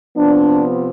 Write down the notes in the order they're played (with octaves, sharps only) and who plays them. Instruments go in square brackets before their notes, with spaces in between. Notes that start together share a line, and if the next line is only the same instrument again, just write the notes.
[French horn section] C3 F3 B3 D4